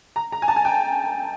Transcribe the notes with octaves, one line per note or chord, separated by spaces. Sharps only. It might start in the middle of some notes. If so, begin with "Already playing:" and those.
A#5
A#5
G#5
A5
G#5
G5